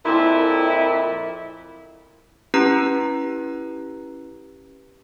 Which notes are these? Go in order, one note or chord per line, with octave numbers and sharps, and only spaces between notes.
F2 A#2 E4
C#4 E4 G4 B4 A#5 F#6